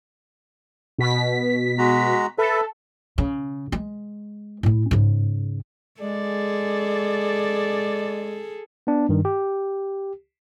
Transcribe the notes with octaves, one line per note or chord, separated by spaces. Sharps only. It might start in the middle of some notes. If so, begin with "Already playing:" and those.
B2 B6
G#3 F#4 A#5
A4 B4 E5
C#3
G#3
A2 E4
G#2 C#3
G#3 G#4 A4 D5
B3 D4
G2 D#3
G4